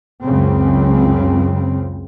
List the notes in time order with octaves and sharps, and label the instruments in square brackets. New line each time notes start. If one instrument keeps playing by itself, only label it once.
[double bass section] C#2 F#2 C#3 C4